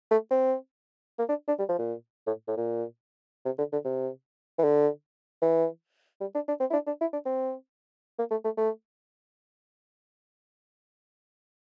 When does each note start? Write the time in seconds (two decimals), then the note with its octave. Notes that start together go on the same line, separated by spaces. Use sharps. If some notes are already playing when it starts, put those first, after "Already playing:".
0.11 A3
0.31 C4
1.19 A#3
1.29 D4
1.48 D4
1.59 G3
1.69 F3
1.79 A#2
2.27 A2
2.48 A2
2.57 A#2
3.45 C3
3.58 D3
3.73 D3
3.85 C3
4.59 E3
4.64 D3
5.42 E3
6.21 G3
6.35 D4
6.48 D4
6.60 C4
6.70 E4
6.73 D4
6.87 D4
7.01 E4
7.13 D4
7.26 C4
8.19 A#3
8.31 A3
8.44 A3
8.57 A3